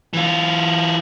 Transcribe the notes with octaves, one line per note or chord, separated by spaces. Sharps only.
E3 F4